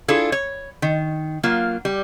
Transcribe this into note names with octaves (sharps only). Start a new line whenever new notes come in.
D4 E4 F4 G#4 A4
C#5
D#3
F#3 A#3 F4
G3